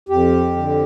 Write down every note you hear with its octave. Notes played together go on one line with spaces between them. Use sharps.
F2 G4
D3